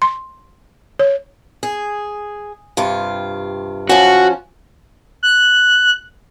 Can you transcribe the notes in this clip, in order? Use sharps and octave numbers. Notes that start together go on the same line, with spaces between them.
C6
C#5
G#4
G2 C3 F4
F3 C#4 F#4
F#6